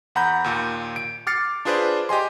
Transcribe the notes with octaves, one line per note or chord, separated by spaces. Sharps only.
E2 F#5 A#5 B5 G6
D#2 A#2
D7
D6 F6 A6 C7 C#7
D4 F4 G#4 B4 C5 D5
G4 D#5 G#5 C6